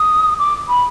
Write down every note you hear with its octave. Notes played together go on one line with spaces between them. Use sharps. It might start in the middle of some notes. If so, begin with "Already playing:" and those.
Already playing: D#6
D6
B5